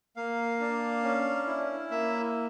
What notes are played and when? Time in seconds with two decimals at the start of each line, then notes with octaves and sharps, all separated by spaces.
0.16 A#3 F5
0.60 D4
1.04 C#4
1.47 E4
1.91 A#3 E5